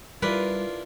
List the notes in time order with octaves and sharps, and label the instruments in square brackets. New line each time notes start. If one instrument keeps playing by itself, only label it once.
[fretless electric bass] G3 [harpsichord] D4 E4 A#4 [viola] F4 [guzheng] B4